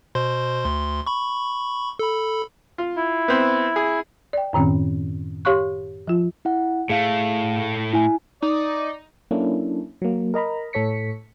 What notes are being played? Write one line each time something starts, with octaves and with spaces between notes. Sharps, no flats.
B2 C5 C6
D2 C6
B5 C#6
A4 B5
F4
E4
B3 C4
G#4
D5 G5
F#2 A2 D#3 C4 C#4
G4 C#5 F5 C6 C#6 F#6
F3 F4
E4 F#5
A2 A3 G#4 F5
E4 G#5
D#4 D5
F#3 A#3 C#4 D4 E4 A4
F#3 A#3
A#4 D#5 A#5 B5
A2 A4 C#5 B6 C#7